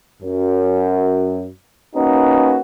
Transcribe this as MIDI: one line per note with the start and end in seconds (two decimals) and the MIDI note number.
0.22 1.48 42
1.96 2.59 58
1.96 2.59 61
1.96 2.59 63
1.96 2.59 66
1.96 2.59 71